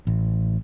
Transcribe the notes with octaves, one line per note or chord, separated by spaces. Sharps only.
A1